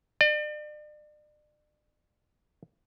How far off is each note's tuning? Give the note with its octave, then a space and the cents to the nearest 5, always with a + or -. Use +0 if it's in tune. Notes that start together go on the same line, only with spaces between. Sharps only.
D5 +40